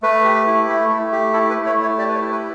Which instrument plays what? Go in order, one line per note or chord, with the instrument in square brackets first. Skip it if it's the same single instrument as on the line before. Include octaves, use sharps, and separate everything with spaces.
[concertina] A3 B4
G4
E4
A3
A3
G4
E4 A4
B4
A3
C#5
A3 C#5
G4 D5
B4
C#5
E4
B4